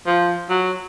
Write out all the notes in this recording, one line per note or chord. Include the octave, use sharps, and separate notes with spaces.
F3
F#3